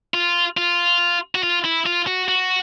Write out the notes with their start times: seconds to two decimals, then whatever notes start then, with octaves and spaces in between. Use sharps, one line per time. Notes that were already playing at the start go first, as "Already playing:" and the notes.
0.14 F4
0.57 F4
1.35 F#4
1.43 F4
1.65 E4
1.86 F4
2.07 F#4
2.28 F#4